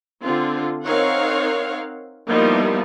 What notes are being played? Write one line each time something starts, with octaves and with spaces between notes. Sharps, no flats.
D3 C4 F4
C4 D#4 A#4 C#5 F5 F#5
F3 G3 A#3 B3 D#4 E4